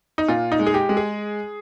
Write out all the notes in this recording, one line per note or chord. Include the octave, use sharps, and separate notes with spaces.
D#4
A#2 F4
D#4
G#3
G#4
G4
G#3
G#4